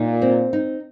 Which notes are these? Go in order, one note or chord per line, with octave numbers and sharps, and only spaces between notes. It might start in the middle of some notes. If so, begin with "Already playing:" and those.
Already playing: A#2 D#4
C4
D#4